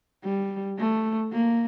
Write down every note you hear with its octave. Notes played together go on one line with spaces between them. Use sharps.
G3
A3
A#3